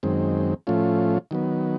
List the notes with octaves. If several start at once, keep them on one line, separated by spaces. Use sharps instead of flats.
F#2 D#3 G#3 C4
A2 F3 A3 C#4 F4
D#3 F#3 B3